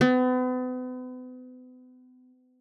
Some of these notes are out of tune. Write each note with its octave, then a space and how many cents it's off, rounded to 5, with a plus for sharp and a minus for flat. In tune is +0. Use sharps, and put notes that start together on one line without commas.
B3 +40